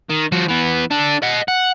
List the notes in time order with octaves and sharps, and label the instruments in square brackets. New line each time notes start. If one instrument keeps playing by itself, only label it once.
[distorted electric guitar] D#3
F3 F#4
E3 B3
D4 A4
D#5 F#5
F#5